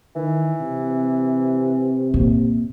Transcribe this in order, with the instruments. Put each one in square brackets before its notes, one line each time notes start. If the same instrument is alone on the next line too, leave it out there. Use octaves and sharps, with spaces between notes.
[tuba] D#3 [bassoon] E3
[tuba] C3
[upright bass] A#2